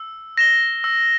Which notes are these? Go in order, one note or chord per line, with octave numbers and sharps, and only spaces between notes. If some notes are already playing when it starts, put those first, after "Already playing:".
Already playing: E6
A#6 E7 G7
E6